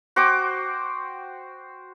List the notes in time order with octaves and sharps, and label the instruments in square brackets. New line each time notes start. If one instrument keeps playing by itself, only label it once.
[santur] F#4 C5 G5 D6